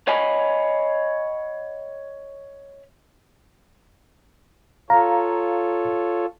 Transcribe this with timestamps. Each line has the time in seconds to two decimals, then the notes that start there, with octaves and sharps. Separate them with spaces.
0.08 C#5 D#5 F5 F#5 G#5 B5
4.90 F4 A4 C#5 F5 A#5